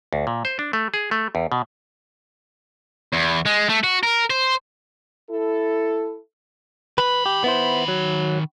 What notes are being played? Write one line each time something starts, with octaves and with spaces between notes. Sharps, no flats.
D2
A#2
C5
D4
A3
G#4
A3
E2
B2
E2
G#3
A3
F#4
A#4
C5
E4 A4
D#3 B4 B5
G4
B3 E4 C5
F#3